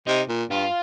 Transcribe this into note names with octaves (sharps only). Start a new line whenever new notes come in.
C3 D#4
A#2
G2 F4